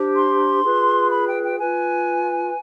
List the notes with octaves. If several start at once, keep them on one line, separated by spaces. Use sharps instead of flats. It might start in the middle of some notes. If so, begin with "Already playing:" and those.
Already playing: D4 G4 C5
C6
F4 G#4 B4
B5
G5
G5
F4 B4 G#5